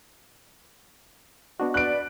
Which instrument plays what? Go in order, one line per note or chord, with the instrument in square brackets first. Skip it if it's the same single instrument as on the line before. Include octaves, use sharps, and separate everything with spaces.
[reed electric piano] B3 D4 F#4 [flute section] D#5
[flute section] B4 D5 B5 [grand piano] F#6 D7